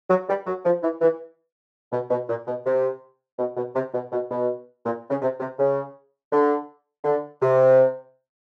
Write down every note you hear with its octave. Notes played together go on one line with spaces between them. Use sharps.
F#3
G3
F#3
F3
E3
E3
B2
B2
A#2
B2
C3
B2
B2
C3
B2
B2
B2
A#2
C#3
C3
C3
C#3
D3
D3
C3